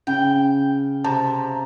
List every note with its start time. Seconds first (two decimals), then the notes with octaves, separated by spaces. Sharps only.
0.07 C#3 G5
1.05 C3 A5 A#5